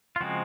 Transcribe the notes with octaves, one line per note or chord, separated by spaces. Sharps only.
F4
C#3 F3 G#3 C4 F#4